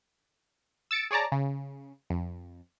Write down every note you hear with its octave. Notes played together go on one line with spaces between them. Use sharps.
E6 A6 C#7 D7
G#4 C#5 D5 A5 A#5
C#3
F2